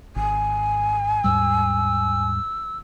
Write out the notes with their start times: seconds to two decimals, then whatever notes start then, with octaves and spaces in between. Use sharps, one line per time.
0.16 G#1 G#5
1.24 D#2 G#2 G3 E6